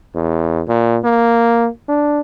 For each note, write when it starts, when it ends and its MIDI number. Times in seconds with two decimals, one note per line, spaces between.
0.15 0.62 40
0.68 0.99 46
1.04 1.68 58
1.88 2.20 62